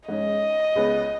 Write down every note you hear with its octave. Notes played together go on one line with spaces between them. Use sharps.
G#2 G#3 C#4 D#5
C#2 C#3 B3